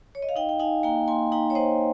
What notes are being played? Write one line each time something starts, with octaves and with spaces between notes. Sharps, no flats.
C#5
D#5
F5
D#4 D#5 G5
G5
D#4 F5 G#5
A#3 G5 A#5
A#3 G#5 C6
D#4 G5 A#5
C#5
D#4 C5 D#5